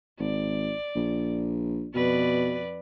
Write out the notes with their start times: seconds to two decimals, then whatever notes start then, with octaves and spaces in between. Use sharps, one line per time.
0.20 G#1 D5
0.95 A#1
1.95 F2 B2 B4 D5